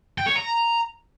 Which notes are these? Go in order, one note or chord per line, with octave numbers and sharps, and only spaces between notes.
G5
C#5
A#5